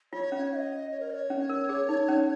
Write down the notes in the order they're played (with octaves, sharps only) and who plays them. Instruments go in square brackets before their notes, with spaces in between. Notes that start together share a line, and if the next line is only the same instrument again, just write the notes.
[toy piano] F4 [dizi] C#5
[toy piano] C#4
[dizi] F5
D#5
C#5
A#4
D#5
C#5
[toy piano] C#4
A#4
G#4
D#4
C#4